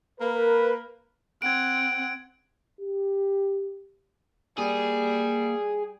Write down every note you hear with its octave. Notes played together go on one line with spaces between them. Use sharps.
A#3 A#4 B4
C4 F#5 G#6 D7
G4
G3 A#3 G#4